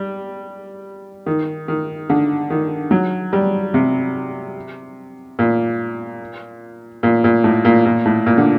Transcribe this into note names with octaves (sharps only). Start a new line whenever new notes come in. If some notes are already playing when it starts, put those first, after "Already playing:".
Already playing: G3
D#3
D#3
D3
D#3
F#3
G3
C3
A#2
A#2
A#2
A2
A#2
A#2
A2
A#2
D3